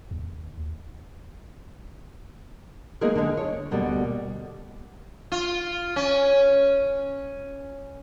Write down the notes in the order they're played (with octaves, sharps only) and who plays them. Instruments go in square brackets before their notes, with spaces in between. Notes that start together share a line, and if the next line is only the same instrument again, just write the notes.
[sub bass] D#2
[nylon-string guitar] G#3 A#3 B3 D#4 G#4 A#4
D3 G#3
C#5
D2 B2 G3 A#3
[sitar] F4
C#4